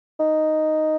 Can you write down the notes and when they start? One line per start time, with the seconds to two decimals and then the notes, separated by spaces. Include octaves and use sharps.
0.20 D#4